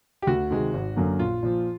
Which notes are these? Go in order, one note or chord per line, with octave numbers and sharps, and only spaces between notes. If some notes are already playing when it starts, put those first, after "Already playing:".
G4
D2 F#4
C3 D#3 G#3
G#1
F#2 D3 F#3 A#3
A#1 F4
A#2 F3